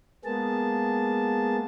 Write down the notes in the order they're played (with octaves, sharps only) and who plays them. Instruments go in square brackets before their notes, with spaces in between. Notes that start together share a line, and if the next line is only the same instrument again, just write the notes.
[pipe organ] G#3 A#3 B3 G#4 A5